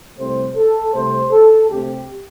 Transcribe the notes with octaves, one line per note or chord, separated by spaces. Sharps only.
C2 C3 A3 C4 C5
A4
C2 C3 A3 C4 C5
A4
D2 C3 A3 C4 G4